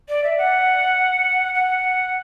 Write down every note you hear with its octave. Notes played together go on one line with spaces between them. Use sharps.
D5
E5
F#5
F#5